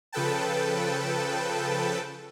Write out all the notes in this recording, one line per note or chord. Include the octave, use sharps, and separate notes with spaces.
C#3 F3 A4 B4 G5 A5